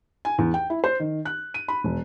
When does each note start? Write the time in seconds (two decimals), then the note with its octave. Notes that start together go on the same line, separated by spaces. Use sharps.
0.25 G#5
0.38 E2
0.54 G5
0.70 E4
0.84 C5
1.00 D#3
1.25 F#6
1.54 D#7
1.68 B5
1.84 E1